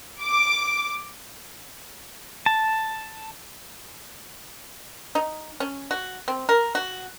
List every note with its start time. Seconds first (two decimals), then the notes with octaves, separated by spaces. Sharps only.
0.22 D6
2.46 A5
5.15 D#4
5.60 C#4
5.91 F#4
6.28 C4
6.49 A#4
6.75 F#4